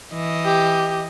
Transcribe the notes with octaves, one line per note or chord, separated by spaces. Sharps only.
E3 D#5
G4